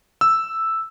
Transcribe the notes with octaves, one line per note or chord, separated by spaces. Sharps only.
E6